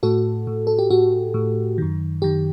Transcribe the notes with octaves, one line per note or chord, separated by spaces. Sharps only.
A2 F#4 A4
A2
A4
G4
A2 F#4
A2
F#2 D#3
F#2 D#3 G4